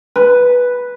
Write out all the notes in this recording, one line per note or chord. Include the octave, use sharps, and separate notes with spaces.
B4